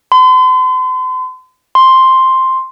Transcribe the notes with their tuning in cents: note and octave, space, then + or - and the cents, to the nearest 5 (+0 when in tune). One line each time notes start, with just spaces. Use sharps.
C6 -40
C6 +0